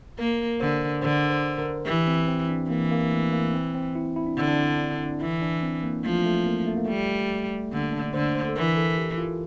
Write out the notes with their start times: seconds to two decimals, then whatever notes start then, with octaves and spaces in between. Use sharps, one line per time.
0.18 A#3 A#4
0.60 D3 C5
1.02 D3 C5
1.31 C5
1.58 A#4
1.85 E3 G4
2.07 C4
2.27 C4
2.49 D4
2.70 E3 A#3
2.91 A#3
3.12 A3
3.32 A#3
3.53 C4
3.75 C4
3.95 E4
4.16 E4
4.26 D4
4.37 D3 C4
4.48 D4
5.21 E3 E4
5.42 D4
5.63 C4
5.83 A#3
6.04 F3 A3
6.25 A3
6.46 A#3
6.67 A3
6.77 A#3
6.86 G3 A3
7.72 D3 A#3
7.93 D4
8.14 D3 C5
8.35 C5
8.49 A4
8.56 E3 A#4
8.77 A4
8.98 G4
9.18 F4